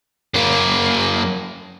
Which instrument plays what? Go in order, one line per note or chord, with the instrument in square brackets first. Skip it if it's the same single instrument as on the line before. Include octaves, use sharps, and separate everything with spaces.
[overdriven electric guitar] F#2 A#3